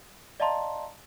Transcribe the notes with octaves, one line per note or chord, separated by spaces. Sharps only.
D5 D#5 F5 A5 A#5 C6